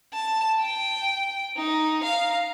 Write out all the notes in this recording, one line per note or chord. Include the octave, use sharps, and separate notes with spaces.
A5
G5
D#4
F5 A#5